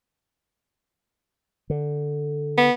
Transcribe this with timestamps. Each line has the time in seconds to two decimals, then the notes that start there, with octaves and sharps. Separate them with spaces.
1.70 D3
2.58 B3